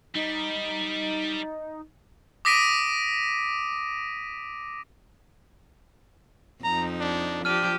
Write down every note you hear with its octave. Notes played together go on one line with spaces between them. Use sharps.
G3 D#4
D6 D#6 A#6 B6 D7 D#7
F2 D#4 A#5
D4
F3 D4 G4 F6 D#7